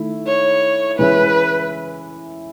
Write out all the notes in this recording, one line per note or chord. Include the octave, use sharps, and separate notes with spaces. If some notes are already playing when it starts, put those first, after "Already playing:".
Already playing: D#3 A3 E4
C#5
E3 G#3 C#4 E4 B4